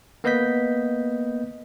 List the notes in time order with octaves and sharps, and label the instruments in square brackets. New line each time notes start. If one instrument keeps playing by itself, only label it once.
[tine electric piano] A#3 B3 B4 D#5 G6 B6